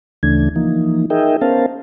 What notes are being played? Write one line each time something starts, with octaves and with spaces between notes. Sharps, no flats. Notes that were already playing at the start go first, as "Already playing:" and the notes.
D2 C#3 E3 A3 D4 G#6
E3 F3 A#3 D#4
D#4 G#4 A#4 D#5 E5 G5
B3 C#4 A#4 C5 F5 A5